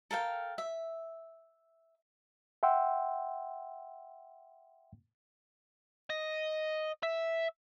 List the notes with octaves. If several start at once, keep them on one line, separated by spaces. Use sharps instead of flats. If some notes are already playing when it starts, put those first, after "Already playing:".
A4 A#4 F5 G5
E5
E5 F#5 G5 C6 E6
D#5
E5